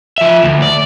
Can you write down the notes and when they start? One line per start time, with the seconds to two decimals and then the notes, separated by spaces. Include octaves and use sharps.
0.18 F3 E5
0.44 D2
0.62 D5